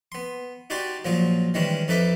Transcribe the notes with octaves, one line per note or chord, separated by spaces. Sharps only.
B3 C6
D#4 F#4 G4 D5 C6 D6
A#2 F3 F#3 F4 G#4
D#3 E3 G3 G#3 C#4 D4
F2 D#4 A4 B4 E5 D6